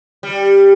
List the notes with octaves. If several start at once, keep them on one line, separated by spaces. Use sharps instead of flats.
G3